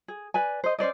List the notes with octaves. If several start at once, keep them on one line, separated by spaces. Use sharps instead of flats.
G#4
B4 D5 G#5
C5 D#5
C#4 C5 D5 D#5